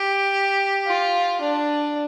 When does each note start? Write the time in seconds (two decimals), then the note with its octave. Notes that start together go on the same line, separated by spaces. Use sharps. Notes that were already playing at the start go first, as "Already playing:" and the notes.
Already playing: G4
0.87 F4
1.41 D4